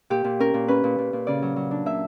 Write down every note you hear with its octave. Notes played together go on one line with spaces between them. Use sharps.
A#2 G4
A#2
C#4 A#4
A#2
C#4 B4
A#2
A#2
A#2
C#3 D5
F#3
F#3
D4
A#3 E5